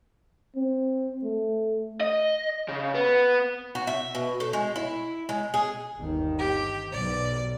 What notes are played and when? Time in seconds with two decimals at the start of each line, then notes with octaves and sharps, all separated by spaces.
0.56 C4
1.23 A3
2.00 D#5
2.69 C#3
2.94 B3
3.75 F#4
3.87 E5
4.15 B2
4.40 A3
4.53 G#3
4.76 E4
5.29 G#3
5.54 G#4
5.98 G1 D#2 D#3
6.38 G4
6.92 B1 D5